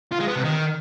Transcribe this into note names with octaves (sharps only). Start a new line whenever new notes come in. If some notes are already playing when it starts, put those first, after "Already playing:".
F4
G#3
B3
C3
D#3